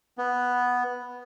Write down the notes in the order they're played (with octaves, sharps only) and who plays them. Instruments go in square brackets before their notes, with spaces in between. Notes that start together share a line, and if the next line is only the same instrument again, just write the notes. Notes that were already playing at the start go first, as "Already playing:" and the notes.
[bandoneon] B3